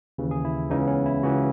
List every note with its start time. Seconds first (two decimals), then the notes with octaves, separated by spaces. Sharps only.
0.18 D#2 C#3 E3
0.31 G#4
0.45 E4
0.70 C#2 C#3 E3 D#4
0.81 B3
0.87 C#4
1.06 E4
1.23 C#2 C#3 E3 F#4